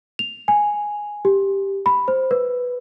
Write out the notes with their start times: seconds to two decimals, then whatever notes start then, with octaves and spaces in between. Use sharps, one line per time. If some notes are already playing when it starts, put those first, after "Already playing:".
0.19 F7
0.48 G#5
1.25 G4
1.86 B5
2.08 C5
2.31 B4